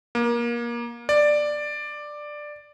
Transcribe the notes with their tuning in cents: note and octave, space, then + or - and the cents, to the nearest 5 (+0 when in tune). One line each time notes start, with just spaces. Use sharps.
A#3 +25
D5 +10